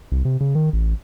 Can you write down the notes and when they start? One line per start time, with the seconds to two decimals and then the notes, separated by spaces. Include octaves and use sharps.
0.12 C2
0.25 C3
0.41 C#3
0.55 D#3
0.73 A1